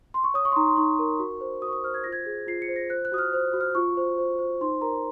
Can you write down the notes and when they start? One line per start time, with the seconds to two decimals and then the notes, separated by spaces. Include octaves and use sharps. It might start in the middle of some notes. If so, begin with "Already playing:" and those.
0.14 C6
0.24 C#6
0.34 C#5 D#6
0.45 C#6
0.52 C6
0.56 D#4 A#5
0.67 C6
0.77 D#4 C#6
0.99 A#4
1.19 F#4
1.41 C5
1.62 F#4 D#6
1.68 C#6
1.73 D#6
1.84 C5 F6
1.94 G#6
2.04 F4 A#6
2.12 G#6
2.26 G#4
2.47 F4 C7
2.62 C#7
2.68 C5
2.76 A#6
2.90 C5 F#6
3.05 F#6
3.12 F#4 D#6
3.18 F6
3.33 C5
3.53 F#4
3.61 F6
3.75 F4 C#6
3.97 C5
4.18 C5
4.39 C5
4.61 D#4 C6
4.81 A#4 A#5